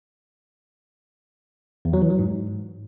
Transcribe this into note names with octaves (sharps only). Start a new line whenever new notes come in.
E2
F#3
E3
F#3
G#2